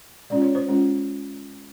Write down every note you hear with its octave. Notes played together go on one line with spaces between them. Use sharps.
G#3 C#4 F4 D5
C#5
C5
G#3 C#4 F4